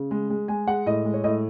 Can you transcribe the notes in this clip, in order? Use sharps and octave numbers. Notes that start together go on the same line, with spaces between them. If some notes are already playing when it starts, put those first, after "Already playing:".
Already playing: C#3
G#3
G#3
G#3 G#5
G#3 F#5
A2 D#5
G#3
C#5
A2 D#5